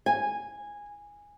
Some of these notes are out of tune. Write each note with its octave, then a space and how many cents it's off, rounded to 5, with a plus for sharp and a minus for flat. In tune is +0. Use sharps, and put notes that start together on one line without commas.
G#5 -10